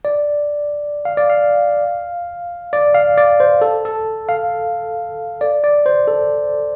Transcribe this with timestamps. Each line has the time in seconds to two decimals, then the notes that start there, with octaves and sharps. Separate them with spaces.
0.05 D5
1.05 F5
1.17 D5
1.30 F5
2.73 D5
2.95 F5
3.17 D5
3.40 C5
3.62 A4
3.85 A4
4.29 F5
5.41 D5
5.64 D5
5.86 C5
6.08 A4